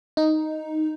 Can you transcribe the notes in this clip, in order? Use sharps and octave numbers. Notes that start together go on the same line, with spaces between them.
D#4